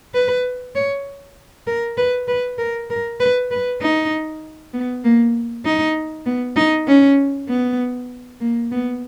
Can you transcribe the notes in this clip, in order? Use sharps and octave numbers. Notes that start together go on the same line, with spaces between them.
B4
C#5
A#4
B4
B4
A#4
A#4
B4
B4
D#4
B3
A#3
D#4
B3
D#4
C#4
B3
A#3
B3